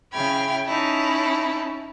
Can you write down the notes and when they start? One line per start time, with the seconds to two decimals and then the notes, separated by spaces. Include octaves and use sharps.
0.14 C#3 E4 G5 B5 F6 G#6
0.67 C#4 D#4 E4 A5